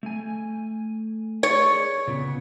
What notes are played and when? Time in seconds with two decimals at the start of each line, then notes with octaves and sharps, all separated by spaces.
0.03 A3 G#5
1.43 G#4 C#5 D5
2.07 A#2 C#3 B3